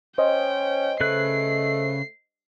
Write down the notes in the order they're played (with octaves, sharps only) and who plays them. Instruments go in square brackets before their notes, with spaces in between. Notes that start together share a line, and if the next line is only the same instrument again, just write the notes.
[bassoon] C#4 [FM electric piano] C5 D#5 [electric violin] G5
[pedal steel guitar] C#3 B4 F#6 [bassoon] A3 [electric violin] C7